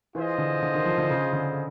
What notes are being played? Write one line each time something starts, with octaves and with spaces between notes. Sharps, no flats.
E3 F4 G#4 C5 D#5
D3
D3
D#3
F3
D3
C#3
D3